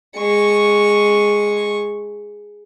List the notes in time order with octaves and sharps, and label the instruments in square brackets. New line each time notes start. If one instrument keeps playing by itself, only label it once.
[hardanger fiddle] G#3 C#6